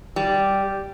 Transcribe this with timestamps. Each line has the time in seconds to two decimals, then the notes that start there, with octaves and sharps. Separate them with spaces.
0.16 G3